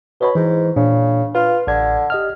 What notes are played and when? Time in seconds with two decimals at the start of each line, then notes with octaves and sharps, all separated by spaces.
0.21 B2 B4 C#5 B5
0.35 G#2 E3
0.76 A#2 C#3 D4
1.35 F4 B4
1.67 A1 D3 G#6
2.10 G4 D#5 F6